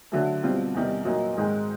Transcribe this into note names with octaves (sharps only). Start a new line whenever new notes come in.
D3 F#3 A3
B2 G3 C4 F4
E2 C3 D#3 G3
A#2 F#3 A#3 D#4
G#2 D#3 G#3